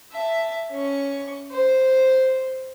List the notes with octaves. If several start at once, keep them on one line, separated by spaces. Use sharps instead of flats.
E5 A5
C#4 C#6
C5